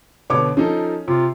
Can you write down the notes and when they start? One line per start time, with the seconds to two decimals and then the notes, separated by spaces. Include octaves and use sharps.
0.30 B2 D3 B3 C#5 D6
0.57 F3 C#4 D#4 A4
1.08 C3 F4